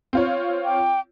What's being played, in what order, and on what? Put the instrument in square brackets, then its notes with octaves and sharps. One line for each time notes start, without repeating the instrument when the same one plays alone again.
[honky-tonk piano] C4 F4 C#5
[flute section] G5 D6